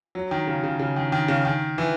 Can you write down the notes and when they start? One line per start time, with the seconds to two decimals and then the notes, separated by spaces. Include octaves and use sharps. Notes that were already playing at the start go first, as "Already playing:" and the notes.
0.15 F#3
0.31 D#3
0.47 C#3
0.64 C#3
0.79 C#3
0.96 D#3
1.12 D#3
1.28 C#3
1.45 D#3
1.78 E3